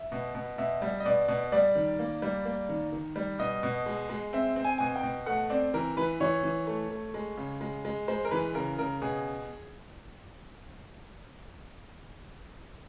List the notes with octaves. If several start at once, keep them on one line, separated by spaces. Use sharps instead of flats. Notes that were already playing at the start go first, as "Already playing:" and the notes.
Already playing: E5
B2
B2
B2 E5
G3
D#5
B2 D5
B2
G3 D5
D#3
A#3
G3
A#3
D#3
D#3
G3
B2 D#5
B2
G#3
G#3
C4 E5
C4
G#5
B2 G#5
G5
B2
A3 F#5
C4 D5
E3 A#4
E3 B4
E3 C#5
E3
A3
A3
G#3
C#3
G#3
G#3
G#3 C5
A#4
E3 B4
C#3 A#4
C#3 A#4
B2 G#4